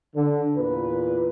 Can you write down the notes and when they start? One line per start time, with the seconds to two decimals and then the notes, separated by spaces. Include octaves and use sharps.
0.16 D3
0.57 E2 A#2 B4